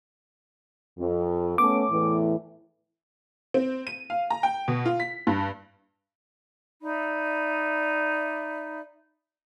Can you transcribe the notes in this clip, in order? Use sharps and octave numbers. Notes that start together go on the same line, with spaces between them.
F2
A3 B3 C#4 D6
E2 A2 E3
C4
D#7
F5
A#5
G5
B2
F4
B6
G2
D#4 D5 E5 B5